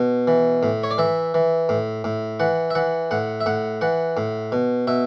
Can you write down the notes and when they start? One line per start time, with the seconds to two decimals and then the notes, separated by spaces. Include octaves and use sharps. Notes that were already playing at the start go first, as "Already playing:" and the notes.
Already playing: B2
0.27 E3
0.63 A2
0.83 C#5
0.91 D5
0.98 E3 E5
1.34 E3
1.69 A2
2.04 A2
2.40 E3 F#5
2.70 E5
2.75 E3 F#5
3.11 A2 F#5
3.41 E5
3.46 A2 F#5
3.81 E3 F#5
4.17 A2
4.52 B2
4.87 B2 E5